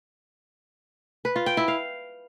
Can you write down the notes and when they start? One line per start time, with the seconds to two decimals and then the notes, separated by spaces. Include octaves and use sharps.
1.25 B4
1.36 F4
1.46 G5
1.57 E4
1.68 F5